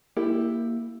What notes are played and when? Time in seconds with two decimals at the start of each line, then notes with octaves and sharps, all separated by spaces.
0.17 A#3 E4 G4